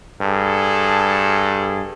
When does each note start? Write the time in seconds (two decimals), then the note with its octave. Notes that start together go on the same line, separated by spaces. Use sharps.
0.21 G2 G#4 A4